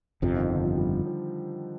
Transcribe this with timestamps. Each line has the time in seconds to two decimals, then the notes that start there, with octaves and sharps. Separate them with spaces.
0.22 G1 F2 C3 F3
0.36 D#3
0.50 D3
0.64 F3
0.78 G3
1.06 F3